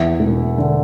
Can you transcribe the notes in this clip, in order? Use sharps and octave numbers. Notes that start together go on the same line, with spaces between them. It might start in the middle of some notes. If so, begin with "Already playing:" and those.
Already playing: E2 E5
E1
D3